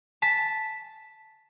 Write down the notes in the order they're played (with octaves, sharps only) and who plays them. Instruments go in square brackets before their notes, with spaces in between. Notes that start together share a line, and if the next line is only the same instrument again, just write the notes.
[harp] A5 B6 E7